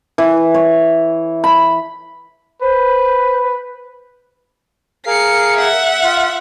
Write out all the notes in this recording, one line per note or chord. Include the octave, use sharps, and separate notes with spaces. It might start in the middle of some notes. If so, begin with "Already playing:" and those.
E3
C#5
B5
B4 C5
G#4 A#4 F5 C7 C#7
E5 F#5
F4